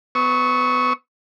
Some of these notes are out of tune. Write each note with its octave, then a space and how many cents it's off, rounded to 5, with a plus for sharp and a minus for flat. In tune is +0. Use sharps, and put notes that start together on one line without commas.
B3 +25 C#6 +0 E6 -45